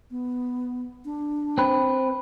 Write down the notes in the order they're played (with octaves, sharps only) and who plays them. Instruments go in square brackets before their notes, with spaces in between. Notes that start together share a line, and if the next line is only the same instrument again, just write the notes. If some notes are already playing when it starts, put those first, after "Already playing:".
[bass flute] B3
D4
[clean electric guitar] C4 B4